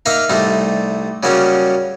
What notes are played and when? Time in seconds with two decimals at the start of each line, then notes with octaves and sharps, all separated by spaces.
0.06 A#3 D#4 E5 F5
0.30 C2 G3 A3 D#4
1.23 C#3 F#3 G3 A#3 C#4